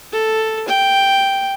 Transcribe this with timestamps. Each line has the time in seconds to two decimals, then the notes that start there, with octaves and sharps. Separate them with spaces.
0.12 A4
0.68 G5